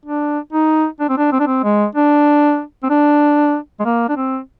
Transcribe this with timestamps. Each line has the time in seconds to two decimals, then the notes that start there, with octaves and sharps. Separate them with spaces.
0.06 D4
0.53 D#4
1.00 D4
1.10 C4
1.18 D4
1.32 C4
1.40 D4
1.47 C4
1.64 G#3
1.95 D4
2.83 C4
2.90 D4
3.80 G#3
3.85 A#3
4.09 D4
4.17 C4